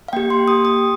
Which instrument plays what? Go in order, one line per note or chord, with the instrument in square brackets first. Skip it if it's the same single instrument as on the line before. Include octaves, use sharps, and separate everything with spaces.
[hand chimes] F5
A#3 G4 G5
C6
A#3 G4 D#6
D#6